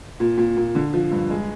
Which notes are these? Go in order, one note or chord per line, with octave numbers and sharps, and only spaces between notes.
A#2
A#2
A#2
D3
F3
G2
G#3